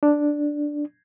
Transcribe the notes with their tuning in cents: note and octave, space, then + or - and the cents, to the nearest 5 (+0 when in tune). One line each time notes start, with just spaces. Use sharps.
D4 +0